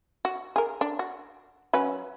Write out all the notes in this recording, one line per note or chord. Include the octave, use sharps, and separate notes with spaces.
F#4
G#4 A#4
D4
F#4
F#3 C#4 B4